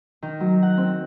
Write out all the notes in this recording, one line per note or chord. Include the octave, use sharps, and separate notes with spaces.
D#3
F#3
F#5
C4